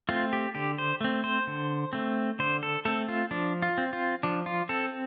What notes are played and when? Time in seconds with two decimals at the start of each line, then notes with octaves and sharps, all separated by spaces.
0.09 A3 C4 F4
0.33 G4
0.55 D3 G4
0.78 C5
1.01 A3 C4
1.24 C5
1.47 D3
1.93 A3 C4
2.39 D3 C5
2.63 A4
2.85 A3 C4 A4
3.08 F4
3.31 F3 D4
3.62 F4
3.78 C4
3.93 F4
4.23 F3 D4
4.46 F4
4.69 C4 A4